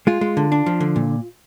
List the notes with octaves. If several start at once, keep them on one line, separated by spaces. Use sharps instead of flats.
G#3 F4
G#3
D3
D4
F3
D3
A#2